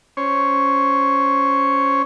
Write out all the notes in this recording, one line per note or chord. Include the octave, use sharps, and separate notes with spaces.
C#4 C5 C#5